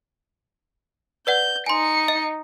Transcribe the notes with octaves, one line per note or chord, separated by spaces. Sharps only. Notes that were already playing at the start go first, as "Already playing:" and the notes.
B4 D5 F#5 G6
D#4 G#5 C6 C#7
D#5